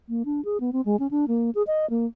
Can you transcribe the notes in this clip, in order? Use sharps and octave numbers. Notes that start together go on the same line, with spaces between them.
A#3
D4
G#4
B3
C4
G#3
C#4
D4
A#3
G#4
D#5
A#3